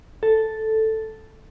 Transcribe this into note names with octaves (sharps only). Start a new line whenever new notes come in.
A4